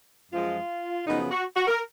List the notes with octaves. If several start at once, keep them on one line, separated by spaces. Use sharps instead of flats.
F#2 F3 G#3 F4
F#2 C#3 F3 B3 D#4
F#4
F#4
A#4